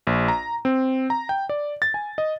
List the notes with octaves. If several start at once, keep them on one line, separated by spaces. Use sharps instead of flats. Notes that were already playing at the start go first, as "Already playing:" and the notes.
A#1
A#5
C4
A#5
G5
D5
A6
G#5
D#5